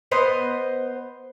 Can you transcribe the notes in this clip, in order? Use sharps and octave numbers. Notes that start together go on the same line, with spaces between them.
B3 C5 D#5